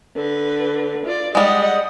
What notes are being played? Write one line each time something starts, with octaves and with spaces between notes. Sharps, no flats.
D3 B4
F4 D5
G3 G#3 D#5 F#5